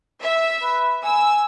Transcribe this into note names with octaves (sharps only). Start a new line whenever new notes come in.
E5
B4
G#5 E6